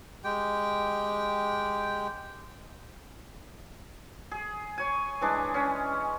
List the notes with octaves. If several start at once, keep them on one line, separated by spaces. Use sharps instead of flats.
G#3 G4 G5
G#4
C#5 G#5
E3 G#3 D4
C#4